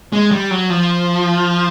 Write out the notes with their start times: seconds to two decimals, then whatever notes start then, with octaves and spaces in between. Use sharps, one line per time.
0.13 G#3
0.31 G3
0.51 F#3
0.70 F3